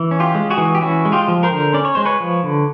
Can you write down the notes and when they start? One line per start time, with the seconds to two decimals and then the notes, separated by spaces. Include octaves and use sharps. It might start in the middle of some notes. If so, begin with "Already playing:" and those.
Already playing: E3
0.11 C#4
0.20 F4 G4
0.35 G#3
0.50 F#4 G#4
0.58 E3
0.75 G4
0.81 C#4 E4 F#4
1.05 G#3
1.12 F4 G4
1.28 F3
1.43 A#4 C5
1.51 D3
1.74 C#4 D5
1.85 C#5
1.95 G#3 C5
2.06 B4 C#5
2.20 F3
2.44 D3